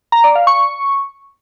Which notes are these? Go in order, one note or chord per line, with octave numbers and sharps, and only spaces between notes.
A#5
D5
F5
C#6